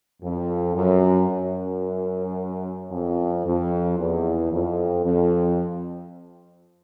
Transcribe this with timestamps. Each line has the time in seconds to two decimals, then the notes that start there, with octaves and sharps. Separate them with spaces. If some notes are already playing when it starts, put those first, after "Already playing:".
0.22 F2
0.75 F#2
1.29 F#2
2.91 F2
3.45 F2
3.98 E2
4.51 F2
5.05 F2